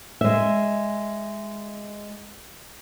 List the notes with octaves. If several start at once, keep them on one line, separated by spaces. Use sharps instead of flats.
G#3 E5